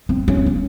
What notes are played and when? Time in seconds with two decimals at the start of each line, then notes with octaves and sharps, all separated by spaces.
0.09 C4
0.28 C#4
0.46 C#4